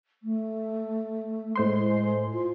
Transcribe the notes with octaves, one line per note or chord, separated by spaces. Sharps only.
A3
A2 G#3 C5 C6
F4